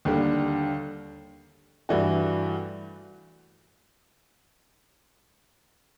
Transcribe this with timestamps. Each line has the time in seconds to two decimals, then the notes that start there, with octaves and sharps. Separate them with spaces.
0.05 D#2 D3 G3 A#3
1.89 G2 E3 A3 D4 F#4